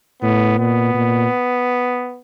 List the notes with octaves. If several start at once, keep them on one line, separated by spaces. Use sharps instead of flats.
A2 B3
A#2 B3
A#2